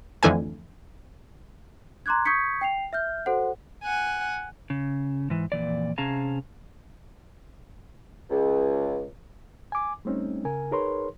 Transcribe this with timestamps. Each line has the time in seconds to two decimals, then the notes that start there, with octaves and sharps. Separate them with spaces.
0.23 F2 D3 E3 A3 G#5
2.06 A#5 C6 D6 F#6 G#6
2.25 C#6 D#6 G6 G#6 B6 C#7
2.61 G5 C7 F7
2.93 E5 F6 G6
3.26 F#4 A4 C5 F#5
3.84 F#5 G#5
4.70 C#3
5.30 G#2 E3
5.52 F2 A#2 E3 D5
5.98 C3 C#4 G#4 F5 A5 A#5
8.30 C#2
9.72 G#5 D6
10.05 G3 A3 C4 C#4 D#4
10.45 C#3 A#4 G#5
10.71 D#4 G#4 A#4 B4 C#5 C6